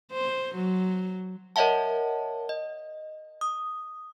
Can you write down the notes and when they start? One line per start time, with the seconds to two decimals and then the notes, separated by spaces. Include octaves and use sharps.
0.12 C5
0.55 F#3
1.56 A#4 C#5 D#5 E5 F#5 A5
2.49 D#5
3.41 D#6